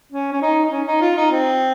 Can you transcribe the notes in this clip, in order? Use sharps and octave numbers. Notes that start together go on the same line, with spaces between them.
C#4
C#4
D#4
D#4
C#4
D#4
F4
D#4
C4